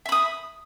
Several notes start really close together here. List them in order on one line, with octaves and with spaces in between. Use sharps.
E5 B5 D#6